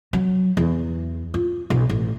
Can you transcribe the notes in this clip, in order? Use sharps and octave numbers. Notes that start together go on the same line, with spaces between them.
F#3
E2
F4
B1
A1